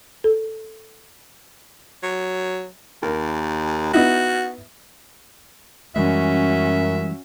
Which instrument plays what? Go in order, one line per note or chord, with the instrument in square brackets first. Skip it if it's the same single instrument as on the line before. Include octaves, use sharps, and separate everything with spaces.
[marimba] A4
[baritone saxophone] F#3
[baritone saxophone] D#2 [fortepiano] A#4
[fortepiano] B3 D#4 E4 [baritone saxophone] F#4
[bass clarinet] F#2 [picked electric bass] E3 G3 G#3 [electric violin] C#4 F#4 [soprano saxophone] E5